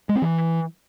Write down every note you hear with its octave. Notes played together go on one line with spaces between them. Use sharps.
G#3
C4
E3